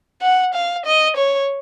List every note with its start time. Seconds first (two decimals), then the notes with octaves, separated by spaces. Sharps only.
0.22 F#5
0.54 F5
0.86 D#5
1.17 C#5